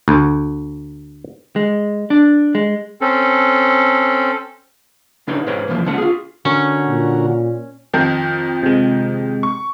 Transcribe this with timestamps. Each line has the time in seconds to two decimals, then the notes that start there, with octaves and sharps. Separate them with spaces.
0.08 D2
1.56 G#3
2.10 D4
2.55 G#3
3.01 C4 C#4 A4
5.27 C#3 D4 D#4 B4 C#5 G5
5.47 G#2 B4 C#5 G5
5.68 C2 F#2 E3 F3 A#3
5.86 C#3 G#3 B3 F#5 A5
5.98 F4 G#4
6.45 D3 C#4 F#4 A#4
6.88 A#2
7.94 F2 D#3 F3
8.63 C3 G#3
9.43 C#6